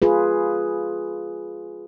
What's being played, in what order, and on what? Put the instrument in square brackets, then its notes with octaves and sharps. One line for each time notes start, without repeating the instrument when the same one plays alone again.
[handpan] F4 G#4 B4